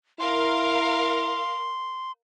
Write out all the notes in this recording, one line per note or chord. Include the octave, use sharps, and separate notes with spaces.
E4 A#4 F5 C6